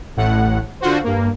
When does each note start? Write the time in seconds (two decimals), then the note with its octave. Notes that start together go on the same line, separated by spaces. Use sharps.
0.17 A1 A2 F#5
0.81 D3 F4 F#4 C5
1.04 G2 A#3